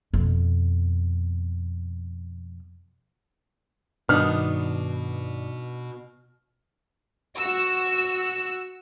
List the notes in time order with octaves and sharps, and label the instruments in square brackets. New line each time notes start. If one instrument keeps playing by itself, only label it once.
[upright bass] F2 B2
[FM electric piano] G2 D#3 D5 [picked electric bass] B2 [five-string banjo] B3 D4 D#4 [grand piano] F6
[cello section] F#4 [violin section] E6